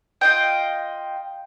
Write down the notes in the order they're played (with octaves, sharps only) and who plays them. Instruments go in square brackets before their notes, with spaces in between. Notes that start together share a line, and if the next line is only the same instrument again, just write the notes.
[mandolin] F4 D#5 G5